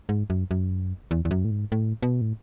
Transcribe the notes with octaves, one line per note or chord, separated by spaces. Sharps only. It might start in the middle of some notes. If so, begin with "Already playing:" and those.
G#2
F#2
F#2
E2
E2
F#2
A2
G#2
A2
B2
A2